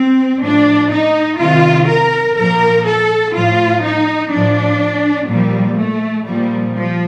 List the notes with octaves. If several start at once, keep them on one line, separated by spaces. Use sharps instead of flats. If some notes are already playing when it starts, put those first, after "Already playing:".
Already playing: C4
A2 F3 D4
D#4
C3 D#3 F4
A#4
A#2 F3 A#4
A4
A2 F3 F4
D#4
A2 F3 D4
A#2 F3 G3
A3
A#2 F3 G3
F3